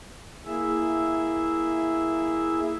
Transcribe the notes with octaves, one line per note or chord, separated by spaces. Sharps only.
A#3 E4 G#4 E5